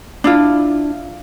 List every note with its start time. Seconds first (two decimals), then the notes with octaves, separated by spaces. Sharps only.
0.24 D4 E4 F4